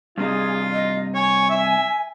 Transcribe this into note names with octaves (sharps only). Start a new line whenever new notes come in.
G2 C3 D#4 F4 G#4
D#5
C#5 G#5
E5